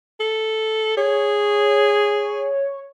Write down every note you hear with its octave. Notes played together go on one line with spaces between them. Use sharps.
A4
G#4 C#5